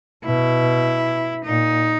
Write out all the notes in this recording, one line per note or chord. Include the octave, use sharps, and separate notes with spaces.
B2 E4
A#2 D#4